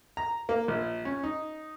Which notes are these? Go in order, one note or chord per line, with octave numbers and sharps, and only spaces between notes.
A#5
A#3
A#1
C#4
D#4